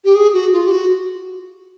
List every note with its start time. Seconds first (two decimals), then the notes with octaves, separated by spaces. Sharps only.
0.05 G4
0.15 G#4
0.33 F#4
0.53 F4
0.67 G4
0.71 F#4